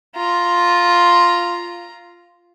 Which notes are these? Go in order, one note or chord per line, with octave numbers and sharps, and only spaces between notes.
F4 A#5